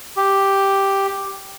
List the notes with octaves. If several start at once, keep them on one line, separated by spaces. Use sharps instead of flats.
G4